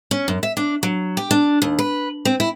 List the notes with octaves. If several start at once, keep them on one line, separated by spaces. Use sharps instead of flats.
C#4
F#2
E5
D4
F#3
G4
D4
D#2
B4
C4
E4